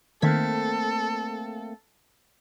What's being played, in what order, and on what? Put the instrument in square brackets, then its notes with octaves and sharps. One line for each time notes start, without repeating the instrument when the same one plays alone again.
[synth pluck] D#3 G#6 B6 [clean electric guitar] A3 A#3 C4 [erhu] A4